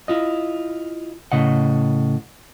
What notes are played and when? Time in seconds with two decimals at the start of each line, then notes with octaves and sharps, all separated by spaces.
0.08 E4 F4 D#5
1.32 A2 C#3 D#5 F#5